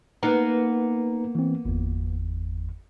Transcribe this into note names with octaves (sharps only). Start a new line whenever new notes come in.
A#3 B3 D#4 B4 A#5
E3 C4
G1 E2